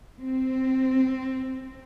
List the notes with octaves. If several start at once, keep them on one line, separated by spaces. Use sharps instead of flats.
C4